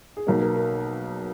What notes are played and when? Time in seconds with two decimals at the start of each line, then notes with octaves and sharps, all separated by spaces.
0.17 G#4
0.27 B1 B2 A#3 A#4
0.42 A#4
0.56 A#4